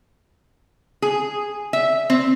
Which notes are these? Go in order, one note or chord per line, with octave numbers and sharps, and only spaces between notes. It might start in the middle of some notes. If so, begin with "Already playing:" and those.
G#4
E5
C4